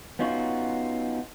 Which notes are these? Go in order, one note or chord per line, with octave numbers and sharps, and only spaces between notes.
B3 C#4 D#4 F4 F#4